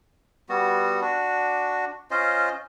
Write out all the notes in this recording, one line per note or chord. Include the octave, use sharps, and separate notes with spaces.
G3 B3 F#4
D4 F#4
C#4 F4 C5 D#5